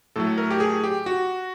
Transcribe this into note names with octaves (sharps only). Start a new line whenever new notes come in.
A2 F#3 A3 A4
A#4
G4
G#4
G4
F#4